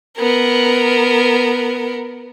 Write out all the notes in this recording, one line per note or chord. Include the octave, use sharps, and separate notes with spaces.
B3 A#4